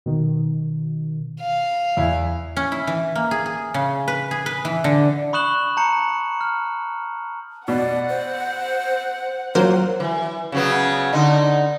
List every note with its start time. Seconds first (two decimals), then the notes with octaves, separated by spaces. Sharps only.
0.06 B2 D#3
1.41 F5
1.97 E2 E4
2.57 C#4
2.72 E4
2.87 E3
3.16 A#3
3.31 G#4
3.46 G#4
3.74 C#3
4.08 B4
4.31 G#4
4.46 B4
4.65 E3
4.84 D3
5.33 B5 C#6 D#6 F#6 E7 F#7
5.77 A5 A#5 G6 C#7
6.41 F6
7.68 B2 D5 F#5
8.09 C5
9.55 F#3 A#3 F4 A#4 C5
10.00 E3
10.52 C#3 F#3 B3
11.13 D3 D#4